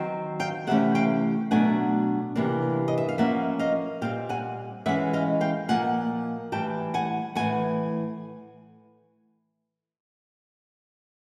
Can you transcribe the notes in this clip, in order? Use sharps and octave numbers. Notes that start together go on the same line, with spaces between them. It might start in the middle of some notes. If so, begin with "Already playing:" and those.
Already playing: D#3 F#3 C4
F5 G5
C3 E3 A3 C#4 E5 F#5
F5 G5
B2 F#3 A3 D4 F#5 G#5
C3 E3 G3 A#3 D4
D#5
E5
F5
F3 A#3 C#4 E5 F#5
D#5 F5
A#2 G3 C4 F5 G5
F#5 G#5
E3 G#3 C#4 E5 F#5
D#5 F5
F5 G5
A#2 F3 A#3 F#5 G#5
A2 E3 G3 G5 A5
F#5 G#5
A2 E3 A3 F#5 G#5